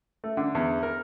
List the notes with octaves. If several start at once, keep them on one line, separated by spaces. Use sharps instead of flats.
A3
D3
E2
A#4